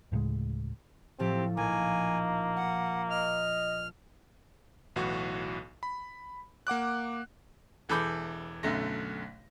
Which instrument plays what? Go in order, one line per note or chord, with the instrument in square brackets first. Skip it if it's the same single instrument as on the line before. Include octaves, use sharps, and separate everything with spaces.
[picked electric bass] D2 A2 C#3 G#3
[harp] A2 F3 A3 [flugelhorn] C4 [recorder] G4
[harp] A#1 [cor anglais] A#3 [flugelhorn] D#4 [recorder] G#5
[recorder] F#5
[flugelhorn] D#5 [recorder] F6
[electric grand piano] B1 A2 E3 F#4
B5
A#3 F#5 D6 F#6
[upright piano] E1 E3 A4 B5 D6 G6
B1 F#2 D3 A3 A#6